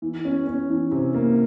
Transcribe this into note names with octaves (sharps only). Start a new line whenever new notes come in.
E3
C#4
C#4
E3
C3
A#3